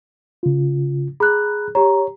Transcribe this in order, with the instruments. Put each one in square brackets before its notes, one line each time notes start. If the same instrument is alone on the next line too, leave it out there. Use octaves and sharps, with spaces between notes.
[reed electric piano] C#3 F4
[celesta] G#4 F#6 [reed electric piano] A#5 B5
[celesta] G4 A#5 [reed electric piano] C#5